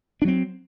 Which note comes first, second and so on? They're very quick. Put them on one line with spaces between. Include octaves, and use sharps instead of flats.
D4 F#3 C4